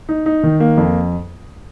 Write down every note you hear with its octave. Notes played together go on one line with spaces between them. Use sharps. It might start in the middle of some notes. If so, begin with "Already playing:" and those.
D#4
D#4
D#3
A#3
F2